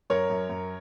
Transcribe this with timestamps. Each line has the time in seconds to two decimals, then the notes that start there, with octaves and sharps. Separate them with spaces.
0.10 F#2 A#4 C#5
0.30 F#2
0.49 F#2